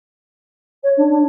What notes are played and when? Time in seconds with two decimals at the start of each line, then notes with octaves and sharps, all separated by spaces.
0.83 C#5
0.97 D4
1.09 D4